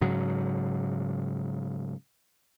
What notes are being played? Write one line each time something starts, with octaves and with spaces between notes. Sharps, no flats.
G#2 C#3 F#3